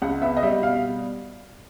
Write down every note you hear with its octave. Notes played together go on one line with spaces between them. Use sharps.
C#2 F#5
B3 E5
D#5
G3 E5
B2 F5